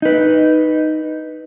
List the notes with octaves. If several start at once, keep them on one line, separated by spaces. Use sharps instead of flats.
D#4 B4